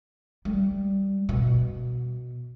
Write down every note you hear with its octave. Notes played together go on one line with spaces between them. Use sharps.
G3
B2